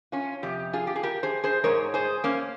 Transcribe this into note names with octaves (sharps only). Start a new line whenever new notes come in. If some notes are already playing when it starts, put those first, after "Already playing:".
C#4 F4
F2 C3 G4
F4 G#4
G4
G#4
G4 A#4
G#4 C5
G#4 C5
G#2 F3 G#3 A#4 C#5
G#4 C5
A#3 C#4